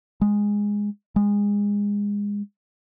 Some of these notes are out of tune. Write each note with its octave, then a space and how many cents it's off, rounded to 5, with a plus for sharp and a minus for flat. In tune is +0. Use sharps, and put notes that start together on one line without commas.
G#3 -10
G#3 -25